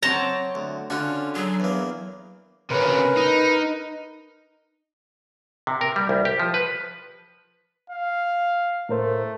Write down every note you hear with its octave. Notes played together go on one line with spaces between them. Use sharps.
F#3 C4 C#5 A5 A#5
D2
D3 C#4 F4 F#4
F#3 G#4
E2 A#3
C3 C#4 A#4 B4
D#4
C3
A#4
G3
C2
G4
F3
B4
F5
A2 A3 A#4 C5